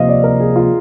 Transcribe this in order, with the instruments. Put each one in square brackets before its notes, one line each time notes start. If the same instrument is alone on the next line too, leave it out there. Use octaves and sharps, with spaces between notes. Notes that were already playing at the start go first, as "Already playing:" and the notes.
Already playing: [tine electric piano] C3 F3 A#3 [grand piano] D#5 F5
[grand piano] D5
A#4
G#4
F4